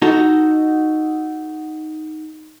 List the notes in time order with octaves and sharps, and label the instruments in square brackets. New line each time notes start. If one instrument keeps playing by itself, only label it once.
[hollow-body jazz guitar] D#4 F#4 A4